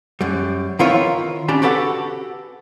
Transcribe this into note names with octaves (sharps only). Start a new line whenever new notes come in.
F#2 G3
D#3 E4 F4 A#4 B4 C#5
C#4 D4 G4 A5 B5
F#4 G4 A4 B4 F#5